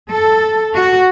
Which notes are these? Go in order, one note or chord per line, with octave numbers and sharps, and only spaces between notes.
A4
F#4